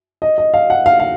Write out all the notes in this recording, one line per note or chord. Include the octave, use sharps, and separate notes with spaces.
D#5
D#5
F5
F#5
F5
F5